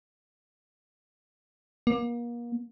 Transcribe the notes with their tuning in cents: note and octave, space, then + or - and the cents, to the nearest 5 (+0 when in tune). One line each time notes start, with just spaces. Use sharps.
A#3 +35